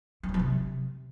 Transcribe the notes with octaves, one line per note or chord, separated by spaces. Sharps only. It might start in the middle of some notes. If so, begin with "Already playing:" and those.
E3
F#3
F3
C3